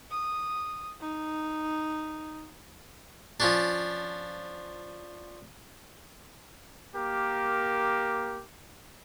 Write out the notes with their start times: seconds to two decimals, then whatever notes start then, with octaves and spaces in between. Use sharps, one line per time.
0.10 D#6
1.01 D#4
3.40 F3 C#4 D4
6.95 A#3 G4 A#4